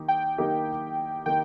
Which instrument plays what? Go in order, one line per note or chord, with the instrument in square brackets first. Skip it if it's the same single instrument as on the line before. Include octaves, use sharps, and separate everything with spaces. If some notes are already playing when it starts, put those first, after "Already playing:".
Already playing: [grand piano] D#3 A#3 D#4 G4
[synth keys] G5
[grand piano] D#3 A#3 D#4 G4
[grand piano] D#3 A#3 D#4 [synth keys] G5